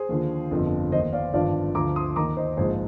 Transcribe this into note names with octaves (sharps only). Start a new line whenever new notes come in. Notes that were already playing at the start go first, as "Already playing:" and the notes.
Already playing: G#4 C5
D#2 D3 F3
G1 F2 D3 F3
D#2 D#3 C5 D#5
D5 F5
G#1 G2 D3 F3 D5 F5
D2 D3 F3 A#5 D6
C6 D#6
D#2 D#3 A#5 D6
C5 D#5
A#1 G#2 F3 G#4 C5